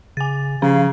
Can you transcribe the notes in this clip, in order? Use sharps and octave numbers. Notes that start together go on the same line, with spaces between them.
C#3 G#5 A6
C#3 F3 C#4 F5